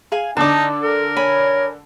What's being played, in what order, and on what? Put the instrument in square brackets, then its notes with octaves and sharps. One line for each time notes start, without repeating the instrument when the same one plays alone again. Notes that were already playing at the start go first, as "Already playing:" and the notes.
[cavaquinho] G#4 F5 G#5
[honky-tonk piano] D3 D4 [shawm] D#4 [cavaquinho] A5 D6
[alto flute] A4 [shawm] A#4
[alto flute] C#5 [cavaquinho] G#5 B5